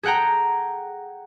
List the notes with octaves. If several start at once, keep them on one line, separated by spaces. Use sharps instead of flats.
G#4 A4 F#5 G5 A#5